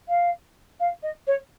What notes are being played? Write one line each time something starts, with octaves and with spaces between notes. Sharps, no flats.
F5
F5
D#5
C#5